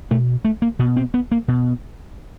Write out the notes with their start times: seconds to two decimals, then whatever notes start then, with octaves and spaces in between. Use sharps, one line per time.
0.11 B2 A3
0.45 A3
0.62 A#3
0.79 B2 B3
0.96 C4
1.14 B3
1.32 A#3
1.48 B2